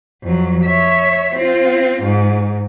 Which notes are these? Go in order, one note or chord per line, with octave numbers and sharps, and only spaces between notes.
F2 F#3
C#5 E5
C4 F4
G#2